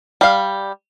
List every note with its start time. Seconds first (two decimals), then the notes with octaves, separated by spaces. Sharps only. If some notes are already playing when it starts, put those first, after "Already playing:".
0.21 G3 F5